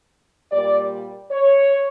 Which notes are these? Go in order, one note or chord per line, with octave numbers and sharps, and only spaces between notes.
A#2 G3 D5
C#5